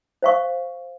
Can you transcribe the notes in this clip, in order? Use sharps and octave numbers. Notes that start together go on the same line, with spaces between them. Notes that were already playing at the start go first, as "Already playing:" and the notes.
C5 F5 C#6